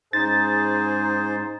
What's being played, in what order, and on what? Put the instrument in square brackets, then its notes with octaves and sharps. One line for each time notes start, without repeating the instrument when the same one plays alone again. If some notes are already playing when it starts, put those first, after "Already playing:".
[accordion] G#2 C5 [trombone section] C#4 G#4 [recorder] D#4 [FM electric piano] A6